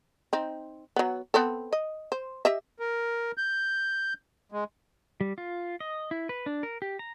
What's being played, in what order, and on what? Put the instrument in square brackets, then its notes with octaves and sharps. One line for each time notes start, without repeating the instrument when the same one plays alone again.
[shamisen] C4 D#4
F#3 B3
B3 C4 A4
D#5
C5
G4 D#5 E5
[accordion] A#4
G6
G#3
[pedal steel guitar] G3
F4
D#5
E4
B4
D4
A#4
G4
A#5